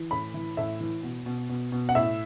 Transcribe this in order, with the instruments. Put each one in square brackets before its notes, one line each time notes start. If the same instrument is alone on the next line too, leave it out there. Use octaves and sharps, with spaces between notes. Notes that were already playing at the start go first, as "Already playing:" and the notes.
Already playing: [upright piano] E3
A2 B5
E3
A2 E5
E3
B2
B2
B2
B2
F#5
A2 E5